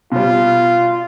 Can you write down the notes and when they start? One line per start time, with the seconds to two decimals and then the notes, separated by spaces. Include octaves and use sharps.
0.12 B2 G3 F4